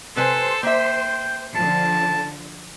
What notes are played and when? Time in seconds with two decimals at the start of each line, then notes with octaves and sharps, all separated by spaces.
0.16 C3 A4 B4 C5 G#5
0.63 A#3 E5 G5
1.55 D3 F3 A5